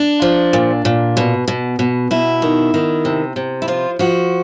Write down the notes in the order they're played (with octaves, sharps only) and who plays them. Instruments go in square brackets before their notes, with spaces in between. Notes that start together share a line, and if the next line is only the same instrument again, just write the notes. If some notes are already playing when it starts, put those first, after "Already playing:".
Already playing: [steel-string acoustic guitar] D4
F3
A#2
A#2
B2
B2
B2
B2 E4
D#3
D#3
C3
C3
E4
F3 F4
F3 F#4